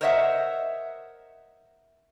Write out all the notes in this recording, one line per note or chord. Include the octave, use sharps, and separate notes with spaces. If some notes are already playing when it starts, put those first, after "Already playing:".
A#4 C5 C#5 D#5 E5 F#5